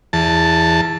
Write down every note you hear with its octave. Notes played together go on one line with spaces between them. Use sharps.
E2 A5